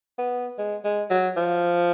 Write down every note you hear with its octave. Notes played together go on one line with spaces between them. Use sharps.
B3
G#3
G#3
F#3
F3